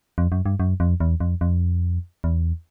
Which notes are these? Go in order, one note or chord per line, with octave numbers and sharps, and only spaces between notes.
F2
F#2
G2
F#2
F2
E2
F2
F2
E2